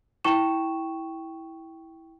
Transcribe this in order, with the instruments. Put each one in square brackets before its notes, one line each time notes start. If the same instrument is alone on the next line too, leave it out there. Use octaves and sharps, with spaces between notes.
[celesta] E4 G5 C#6 E7